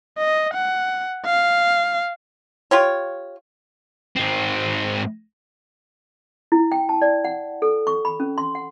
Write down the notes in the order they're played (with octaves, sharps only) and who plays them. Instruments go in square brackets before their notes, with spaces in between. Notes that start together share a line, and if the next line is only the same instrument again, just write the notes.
[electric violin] D#5
F#5
F5
[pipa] F4 G4 C#5
[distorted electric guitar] G#2 C4
[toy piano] E4
G5
A5
D5
F#5
A4
C#6
B5
C#4
C6
F#5